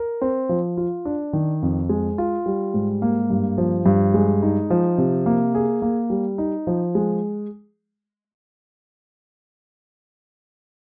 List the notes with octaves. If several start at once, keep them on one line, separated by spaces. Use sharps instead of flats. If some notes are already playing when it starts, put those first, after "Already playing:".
Already playing: A#4
C4
F3
F4
D4
D#3
F2
G#3
F4
G3
G#2
A#3
G2
F3
G2
G#3
D#4
F3
C3
A#3
G#4
A#3
G3
D#4
F3
G#3